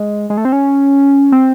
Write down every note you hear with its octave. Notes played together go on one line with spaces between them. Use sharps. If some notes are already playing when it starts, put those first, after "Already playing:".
Already playing: G#3
G#3
A3
C4
C#4
C4